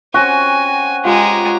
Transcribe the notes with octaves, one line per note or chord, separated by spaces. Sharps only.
C4 C#4 F#4 G5 G#5
G#3 F4 G4 G#5 A#5